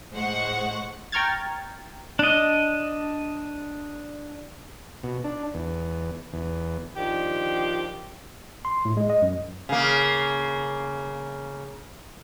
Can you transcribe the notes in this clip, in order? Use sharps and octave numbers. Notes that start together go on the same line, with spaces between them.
A2 G#3 C5 F#5 C#6
G5 A#5 C#6 F6 G#6 A6
D4 D#5
B2
D4
E2
E2
D#3 F3 D4 G4
C6
A2
G#3
D#5
F#2
C#3 A#3